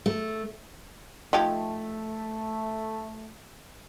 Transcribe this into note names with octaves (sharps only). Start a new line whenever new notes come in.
A3
F3 A3 D#4 G4